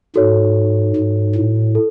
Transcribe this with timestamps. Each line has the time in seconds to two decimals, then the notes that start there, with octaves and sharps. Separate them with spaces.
0.16 G#2 F#4 A4 C#5
0.96 G#2
1.35 A2
1.75 A4